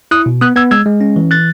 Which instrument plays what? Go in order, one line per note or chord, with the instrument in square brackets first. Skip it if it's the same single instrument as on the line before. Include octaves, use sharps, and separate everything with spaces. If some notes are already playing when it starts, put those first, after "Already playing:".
[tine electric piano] E4 D#6 F#6
B2
B3 D#6 F#6
B3 E6 G#6
G#3 E6 G#6
G#3
C#4
E3
F#6 A6